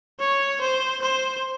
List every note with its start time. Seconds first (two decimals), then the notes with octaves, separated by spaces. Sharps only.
0.20 C#5
0.61 C5
1.02 C5